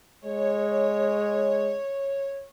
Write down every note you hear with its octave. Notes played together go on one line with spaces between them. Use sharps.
G#3 C#5